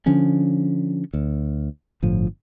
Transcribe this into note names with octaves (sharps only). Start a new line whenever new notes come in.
D3 F3 C#4 D4
D2
G1 A2 F3